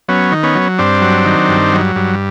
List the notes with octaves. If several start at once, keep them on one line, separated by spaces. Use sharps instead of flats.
F#3 B3 C#4
D#3
B3 C#4
F#3
G2 C4 D4
F#3
D#3
G2
F#3
G2